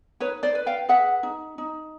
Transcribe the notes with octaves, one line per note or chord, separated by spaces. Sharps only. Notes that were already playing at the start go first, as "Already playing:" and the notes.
D#4 B4 C#5
C5 D5
B4
F5 G5
G#4 E5 F#5
D#4
D#4